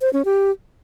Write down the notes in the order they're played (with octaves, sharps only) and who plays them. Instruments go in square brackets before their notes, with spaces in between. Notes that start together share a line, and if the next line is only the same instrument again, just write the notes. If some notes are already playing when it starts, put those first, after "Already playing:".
[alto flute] C5
C#4
G4